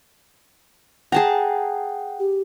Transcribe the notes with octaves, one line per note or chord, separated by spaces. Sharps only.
G#4 F#5 G5 A5 A#5
G4